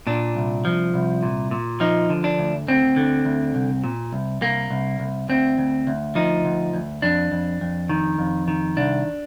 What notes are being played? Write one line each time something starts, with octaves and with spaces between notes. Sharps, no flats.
A#2 D4
C2
F3
C2
A#2
A#2
F3 D#4
D3
D4
D2
D2 C4
D3
D2
C2
A#2
C2
C2 A#3
C2
C2
D2 C4
D2
D2
F3 D#4
D2
D2
F2 D4
F2
F2
D#3
F2
D#3
C2 D4